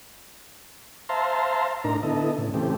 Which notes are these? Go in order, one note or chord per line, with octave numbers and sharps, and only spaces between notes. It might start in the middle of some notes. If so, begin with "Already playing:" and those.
C5 E5 F5 A5 A#5 C6
A2 D4 D#4 A#4 A#5
D3 B3 E4 A4 D#5
A2 C#3
C#3 E3 A3 C4 G4